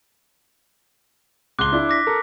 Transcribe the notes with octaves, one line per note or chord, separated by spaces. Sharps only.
C#2 C6 D6 F#6 G7
D4 E4
D6 A#6 B6
A4 A#4